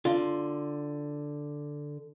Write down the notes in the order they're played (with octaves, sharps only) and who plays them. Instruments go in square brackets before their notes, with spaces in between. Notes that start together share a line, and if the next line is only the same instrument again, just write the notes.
[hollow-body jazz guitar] D3 F4